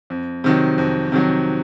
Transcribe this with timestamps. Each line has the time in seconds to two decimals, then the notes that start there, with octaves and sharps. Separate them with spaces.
0.10 F2
0.44 C3 D#3 F#3
0.78 F2
1.12 C3 D#3 F#3